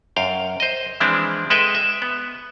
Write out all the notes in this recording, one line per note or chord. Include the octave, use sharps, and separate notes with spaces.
F#2 F5 G5
C5 D#5
E3 F3 G#3 C4 D4 E4
G#3 A4 B4 D#5 E5 G5
E5
B3